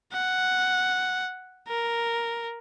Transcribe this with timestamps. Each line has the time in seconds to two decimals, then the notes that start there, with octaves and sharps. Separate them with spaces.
0.13 F#5
1.68 A#4